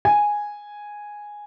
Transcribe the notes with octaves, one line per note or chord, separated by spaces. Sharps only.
G#5